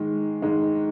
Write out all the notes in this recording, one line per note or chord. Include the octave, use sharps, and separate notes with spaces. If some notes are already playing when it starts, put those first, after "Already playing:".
Already playing: G#2 D#3 G#3
G#2 D#3 G#3